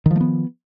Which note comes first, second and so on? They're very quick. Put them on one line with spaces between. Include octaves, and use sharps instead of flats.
D#3 F3 A3 B3